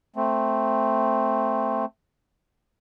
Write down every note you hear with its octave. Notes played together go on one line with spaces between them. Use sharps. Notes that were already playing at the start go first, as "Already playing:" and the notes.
A3 C4